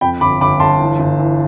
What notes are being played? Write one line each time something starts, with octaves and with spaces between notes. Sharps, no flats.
F2 G5 B5
G1 B5 D6
G1 B5 D6
G1 A5 C6
E3
G1
E3